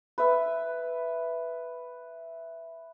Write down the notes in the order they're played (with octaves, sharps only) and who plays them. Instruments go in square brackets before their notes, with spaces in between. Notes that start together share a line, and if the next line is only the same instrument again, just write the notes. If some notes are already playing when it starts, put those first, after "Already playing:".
[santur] B4 E5